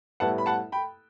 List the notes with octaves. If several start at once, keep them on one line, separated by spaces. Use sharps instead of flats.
A2 G3 B3 E4 F#5 A5
B5
F#5 A5
G5 B5